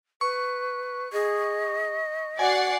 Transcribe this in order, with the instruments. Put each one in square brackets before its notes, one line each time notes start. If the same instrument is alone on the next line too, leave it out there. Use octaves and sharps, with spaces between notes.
[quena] B4 [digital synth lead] C#6
[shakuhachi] G#4 [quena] D#5
[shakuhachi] F#4 [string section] D5 F#5 C7 [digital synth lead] G#5